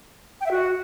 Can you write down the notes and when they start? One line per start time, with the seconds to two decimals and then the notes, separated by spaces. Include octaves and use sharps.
0.40 G5
0.45 E5
0.50 F#4